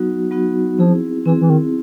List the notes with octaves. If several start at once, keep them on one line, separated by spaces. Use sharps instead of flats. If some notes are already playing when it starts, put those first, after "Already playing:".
Already playing: F#3 B3 D#4 F#4
F#3 B3 D#4 F#4
F3 C4 E4 G#4
E3 C4 E4 G#4
E3
D#3